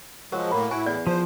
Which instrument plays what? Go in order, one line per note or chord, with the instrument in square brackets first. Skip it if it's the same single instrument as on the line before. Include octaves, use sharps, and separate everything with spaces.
[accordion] F3 G#3 [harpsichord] F#3 [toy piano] A#4
[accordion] A2 A#3 [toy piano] B5
[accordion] A2 E4 [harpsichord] F#4 [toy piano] G#5
[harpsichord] E2 [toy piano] D5
[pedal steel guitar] F3 [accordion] C5